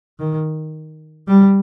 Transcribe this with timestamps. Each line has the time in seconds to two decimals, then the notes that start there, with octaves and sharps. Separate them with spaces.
0.19 D#3
1.27 G3